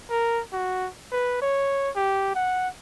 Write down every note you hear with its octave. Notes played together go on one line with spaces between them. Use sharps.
A#4
F#4
B4
C#5
G4
F#5